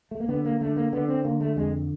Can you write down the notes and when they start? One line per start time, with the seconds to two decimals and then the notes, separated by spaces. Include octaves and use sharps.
0.11 A3
0.20 A#3
0.29 D3 B3
0.45 A#3
0.61 D3 A3
0.76 A#3
0.93 D3 B3
1.09 C4
1.24 D3 A#3
1.41 A3
1.57 F2 G#3